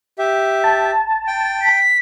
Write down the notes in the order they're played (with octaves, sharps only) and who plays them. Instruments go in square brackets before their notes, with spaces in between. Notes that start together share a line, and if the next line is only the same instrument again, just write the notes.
[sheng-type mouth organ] G4 E5
[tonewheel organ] A5
[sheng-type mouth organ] G5
[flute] B6